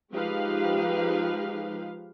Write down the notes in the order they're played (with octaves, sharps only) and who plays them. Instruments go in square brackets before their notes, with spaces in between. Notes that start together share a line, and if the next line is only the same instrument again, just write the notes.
[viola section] F3 G#3 D#4 G4 B4 F5